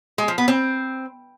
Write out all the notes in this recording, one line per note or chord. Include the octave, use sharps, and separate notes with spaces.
G#3
F3
B3
C4